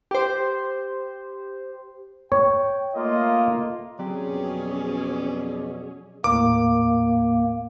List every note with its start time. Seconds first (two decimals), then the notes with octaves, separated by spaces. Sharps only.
0.11 G4 C5
2.32 C#5 G5
2.95 A3 A#3 F4 D#5
3.99 F#3 C4 C#4 G4 G#4 D5
4.28 F2 B2
6.24 D#2 A2 A#3 A#4 D6